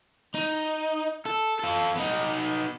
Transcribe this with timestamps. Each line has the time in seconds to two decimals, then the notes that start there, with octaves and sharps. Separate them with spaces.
0.35 D#4
1.26 A4
1.60 F4 A4
1.96 B3 D#4